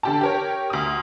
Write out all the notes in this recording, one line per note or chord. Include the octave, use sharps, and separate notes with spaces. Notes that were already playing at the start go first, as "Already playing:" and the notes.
D3 G4 A5
G4 A#4 C#5
D2 D#6